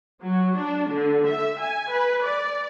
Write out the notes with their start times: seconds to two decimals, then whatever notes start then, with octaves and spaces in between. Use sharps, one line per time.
0.22 F#3
0.57 D4
0.90 D3
1.26 E5
1.60 G#5
1.91 B4
2.24 D5